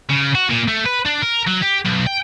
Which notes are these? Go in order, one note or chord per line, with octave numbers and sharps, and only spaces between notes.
C#3
F#4
A#2
A3
B4
D4
A#4
F#3
G4
B1
G5